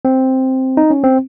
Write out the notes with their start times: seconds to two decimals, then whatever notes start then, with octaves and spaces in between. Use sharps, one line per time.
0.05 C4
0.77 D#4
0.90 C#4
1.04 C4